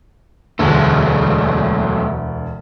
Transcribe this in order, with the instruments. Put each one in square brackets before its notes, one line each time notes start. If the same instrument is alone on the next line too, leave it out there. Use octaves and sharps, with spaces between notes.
[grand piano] E1 D2 [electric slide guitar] F#3 G#3 A3